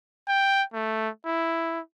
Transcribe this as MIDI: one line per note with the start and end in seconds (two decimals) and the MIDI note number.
0.28 0.63 79
0.74 1.09 57
1.26 1.80 64